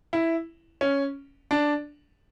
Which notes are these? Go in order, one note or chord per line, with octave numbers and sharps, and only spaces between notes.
E4
C#4
D4